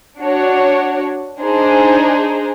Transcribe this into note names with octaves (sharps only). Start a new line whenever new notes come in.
D4 F#4 C#5
D4 D#4 G#4 C5